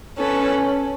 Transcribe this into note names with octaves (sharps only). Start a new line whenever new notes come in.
C#4 A4 B4